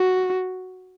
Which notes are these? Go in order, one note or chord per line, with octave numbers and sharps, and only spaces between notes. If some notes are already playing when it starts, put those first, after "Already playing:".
Already playing: F#4